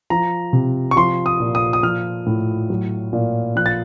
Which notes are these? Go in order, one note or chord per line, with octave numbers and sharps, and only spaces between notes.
F3 A#5
C3
C#6
F3 C6
D#6
A#2
D#6
D#6
F3 F6
A2
F#3
A#2
F3 F#6
A6